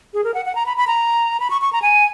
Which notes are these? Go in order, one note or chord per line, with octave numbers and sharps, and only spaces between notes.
G#4
A#4
F#5
F#5
A#5
B5
B5
A#5
B5
C#6
C#6
A#5
G#5